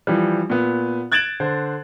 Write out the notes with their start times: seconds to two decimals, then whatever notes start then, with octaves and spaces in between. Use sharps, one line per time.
0.07 E3 F3 G3
0.50 A#2 B3
1.12 F#6 G#6 A6 D7 E7 F#7
1.40 D3 C5